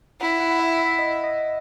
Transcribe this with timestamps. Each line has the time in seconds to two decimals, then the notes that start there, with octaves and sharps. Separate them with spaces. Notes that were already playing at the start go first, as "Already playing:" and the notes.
0.21 E4 F#5
0.40 F#5
0.51 F#5
0.60 E5
0.79 E5
0.99 D#5
1.24 D#5